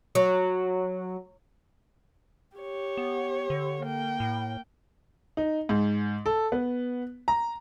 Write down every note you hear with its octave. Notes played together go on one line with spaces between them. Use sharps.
F#3
G4 C#5
B3
D3
A#3 G5
A2
D#4
G#2
A4
B3
A#5